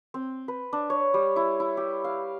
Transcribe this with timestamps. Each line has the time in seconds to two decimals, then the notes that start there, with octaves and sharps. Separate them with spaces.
0.14 C4
0.48 B4
0.73 D4
0.90 C#5
1.14 G3
1.36 E4
1.60 E4
1.77 G4
2.04 F5